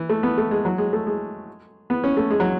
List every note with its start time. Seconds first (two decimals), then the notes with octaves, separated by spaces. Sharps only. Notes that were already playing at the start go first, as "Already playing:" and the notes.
Already playing: E3
0.09 A3
0.23 B3
0.38 A3
0.51 G#3
0.65 F#3
0.78 G#3
0.93 A3
1.07 G#3
1.90 B3
2.04 C#4
2.17 A3
2.31 G#3
2.40 F#3